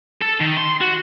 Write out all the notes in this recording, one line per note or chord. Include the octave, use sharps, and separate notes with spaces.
A4
D#3
C6
F#4